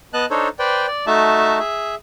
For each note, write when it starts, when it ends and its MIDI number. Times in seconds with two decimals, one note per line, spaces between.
0.14 0.26 59
0.14 0.26 75
0.14 0.26 81
0.14 0.26 90
0.30 0.48 62
0.30 0.48 63
0.30 0.48 69
0.30 0.48 72
0.30 0.48 73
0.59 0.87 71
0.59 0.87 72
0.59 0.87 74
0.59 0.87 79
0.87 1.05 74
1.07 1.59 57
1.07 1.59 63
1.07 1.59 66
1.07 1.59 76
1.07 1.59 81
1.59 1.95 68
1.59 1.95 76